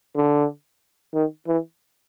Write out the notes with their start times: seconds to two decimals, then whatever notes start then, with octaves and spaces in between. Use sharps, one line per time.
0.16 D3
1.14 D#3
1.47 E3